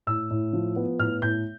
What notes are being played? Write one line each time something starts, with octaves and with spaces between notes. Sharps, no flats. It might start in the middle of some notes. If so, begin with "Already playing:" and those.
A2 E6
A2
F3
B3
A2 F6
A2 G6